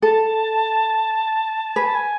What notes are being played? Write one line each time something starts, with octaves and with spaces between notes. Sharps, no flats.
A4 A5
B4 G#5
A5
G#5